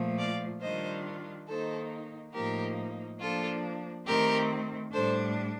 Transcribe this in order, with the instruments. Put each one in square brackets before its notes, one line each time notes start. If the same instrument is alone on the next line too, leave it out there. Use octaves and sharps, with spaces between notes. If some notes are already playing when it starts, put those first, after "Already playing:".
Already playing: [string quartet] A#2 F3 A3
D5 F5
D#3 G3 D4 F4 C5 D#5
D#3 A#3 D#4 A4 C5
A2 F3 A#3 D#4 G4 A#4
F3 A#3 D4 F4 A4
D#3 A3 C4 G4 A#4
A2 G3 D4 A4 C5